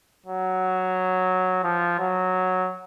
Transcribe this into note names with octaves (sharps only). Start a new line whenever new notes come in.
F#3
F3
F#3